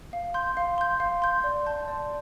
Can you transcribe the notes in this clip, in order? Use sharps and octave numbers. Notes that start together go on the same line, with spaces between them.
F5
C6 G6
F5
C6 G6
F5
C6 G6
D5
A5 C6 G6
D5